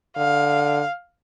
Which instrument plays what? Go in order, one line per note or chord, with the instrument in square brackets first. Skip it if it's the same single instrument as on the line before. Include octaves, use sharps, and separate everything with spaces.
[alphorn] D3 [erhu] F5